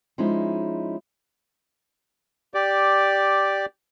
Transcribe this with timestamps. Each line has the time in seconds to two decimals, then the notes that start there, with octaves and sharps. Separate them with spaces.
0.18 F3 G#3 C#4 D#4 E4
2.54 G4 D5